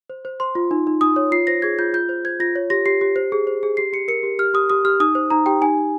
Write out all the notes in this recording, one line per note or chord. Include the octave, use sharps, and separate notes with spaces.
C5
C5
C5 C6
F4
D#4
D#4
D#4 D#6
C#5
F4 C7
C5 A#6
G#4 G#6
F4 G6
F4 G6
C5
C5 G#6
F4 A#6
C#5
G4 A#6
G4 C7
G4
C5
G#4
C5
G#4
G4 C7
G4 C#7
A#4 C#7
G4
G4 F6
G4 D#6
G4 D#6
G4 F6
D#4 D#6
C5
D#4 A#5
G4 G5
D#4 G#5
D#4